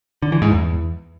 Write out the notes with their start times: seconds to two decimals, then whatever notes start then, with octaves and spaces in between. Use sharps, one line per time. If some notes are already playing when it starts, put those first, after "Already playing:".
0.22 D3
0.32 E3
0.42 G#2
0.51 E2